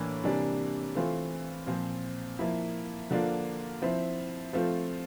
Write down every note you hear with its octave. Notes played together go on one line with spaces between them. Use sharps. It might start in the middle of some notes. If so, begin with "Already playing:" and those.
Already playing: A2 E3 A#3 D4
C3 E3 G3 A#3 D4
E3 A3 C4 F4
A#2 F3 C4
F3 A#3 E4
D3 F3 A#3 D4 F4
F3 C4 E4
F3 A3 C4 F4